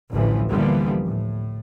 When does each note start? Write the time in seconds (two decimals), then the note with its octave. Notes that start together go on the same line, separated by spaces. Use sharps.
0.11 A1 D2 A2 E3 F3
0.51 D3 E3 F3 G3 A#3 B3
1.04 A2